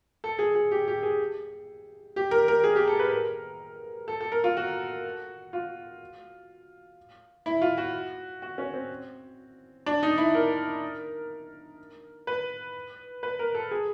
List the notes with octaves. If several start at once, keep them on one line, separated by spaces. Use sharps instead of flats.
A4
G#4
G#4
G4
G4
G#4
G4
A#4
A#4
G#4
G4
A4
B4
A#4
A4
A4
A#4
F4
F#4
F4
E4
F4
F#4
F#4
C#4
C4
D4
D#4
E4
A#4
B4
B4
A#4
A4
G#4